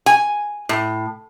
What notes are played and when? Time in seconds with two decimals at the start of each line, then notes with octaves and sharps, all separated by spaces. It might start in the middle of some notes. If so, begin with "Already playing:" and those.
0.06 G#5
0.69 A2